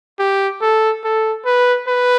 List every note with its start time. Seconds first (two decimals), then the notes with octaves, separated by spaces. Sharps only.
0.19 G4
0.61 A4
1.04 A4
1.45 B4
1.88 B4